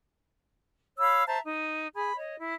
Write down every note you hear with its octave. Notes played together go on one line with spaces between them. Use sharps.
C#5 F5 B5 E6
C5 E5 A5 A#5
D#4
G#4 B5
C#5 D#5
E4